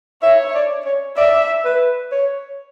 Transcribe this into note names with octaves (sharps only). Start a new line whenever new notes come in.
C#5 E5
D5
C#5
D5 E5
B4
C#5